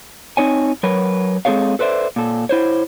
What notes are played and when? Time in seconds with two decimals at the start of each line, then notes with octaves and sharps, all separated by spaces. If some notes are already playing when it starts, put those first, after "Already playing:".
0.37 C4 D#4 C#5 G#5
0.83 F#3 A#4 B4 C#5
1.45 G#3 C4 G#4 A4 C#5 F5
1.79 A4 B4 C5 D5 E5
2.16 A#2 A4
2.49 E4 C5 C#5